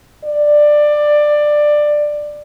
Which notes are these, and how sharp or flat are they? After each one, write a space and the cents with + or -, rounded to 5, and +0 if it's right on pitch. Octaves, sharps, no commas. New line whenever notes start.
D5 +15